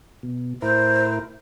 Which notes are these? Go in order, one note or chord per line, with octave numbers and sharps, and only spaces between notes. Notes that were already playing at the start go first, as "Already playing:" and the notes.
B2
A2 E4 A#4 C5